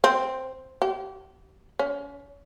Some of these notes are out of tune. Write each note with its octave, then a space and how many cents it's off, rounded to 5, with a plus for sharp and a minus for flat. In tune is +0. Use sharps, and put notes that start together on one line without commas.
C4 +0
G4 -30
C#4 +35